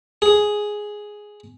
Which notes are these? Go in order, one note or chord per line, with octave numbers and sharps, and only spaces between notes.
G#4